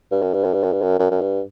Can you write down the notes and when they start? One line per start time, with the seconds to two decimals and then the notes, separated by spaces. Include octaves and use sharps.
0.12 G2
0.22 F#2
0.34 G2
0.44 F#2
0.54 G2
0.63 F#2
0.73 G2
0.82 F#2
0.99 F#2
1.11 F#2
1.21 G2